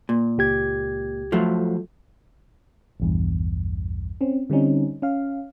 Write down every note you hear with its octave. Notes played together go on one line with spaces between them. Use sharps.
A#2
C#2 G4 G#6
F3 F#3 A3
A#1 E2 G2
C4 C#4
D3 G3 C4 C#4 D#4
C#4 F5